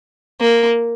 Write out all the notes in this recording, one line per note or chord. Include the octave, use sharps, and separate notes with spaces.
A#3